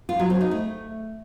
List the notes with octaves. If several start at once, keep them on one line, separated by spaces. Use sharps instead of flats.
F4
F#3
C4
D#4
A3